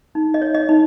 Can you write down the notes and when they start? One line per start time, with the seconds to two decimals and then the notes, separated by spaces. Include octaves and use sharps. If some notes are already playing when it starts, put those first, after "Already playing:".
0.15 D#4
0.34 D#5
0.42 C#5
0.55 D#5
0.69 D#4